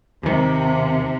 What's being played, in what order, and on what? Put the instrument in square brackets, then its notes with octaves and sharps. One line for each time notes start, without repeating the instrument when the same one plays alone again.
[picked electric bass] D#2 D#3 [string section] C3